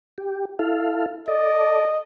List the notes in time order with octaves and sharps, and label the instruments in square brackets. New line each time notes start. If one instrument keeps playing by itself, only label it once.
[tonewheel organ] G4
E4 A4 F5
[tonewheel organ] A4 D5 [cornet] D#5